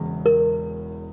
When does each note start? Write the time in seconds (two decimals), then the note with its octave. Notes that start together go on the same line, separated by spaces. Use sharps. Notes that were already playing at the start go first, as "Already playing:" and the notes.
Already playing: E1 E2 C#3
0.26 A#4